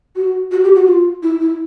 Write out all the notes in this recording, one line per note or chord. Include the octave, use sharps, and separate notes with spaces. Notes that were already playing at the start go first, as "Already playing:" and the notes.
F#4
F#4
G4
F#4
F4
E4
E4